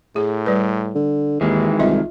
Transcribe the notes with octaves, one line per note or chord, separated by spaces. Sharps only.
A2 G#4
G3 B4
D3
D#2 D#3 E3 G#3
C2 F4 D#5 E5